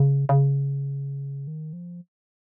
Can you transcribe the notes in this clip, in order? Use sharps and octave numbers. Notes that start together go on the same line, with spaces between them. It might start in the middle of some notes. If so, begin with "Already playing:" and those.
Already playing: C#3
C#3
D#3
F3